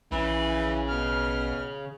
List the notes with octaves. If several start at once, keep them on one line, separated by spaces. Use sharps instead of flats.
A#1 C#3 E3
B2 F6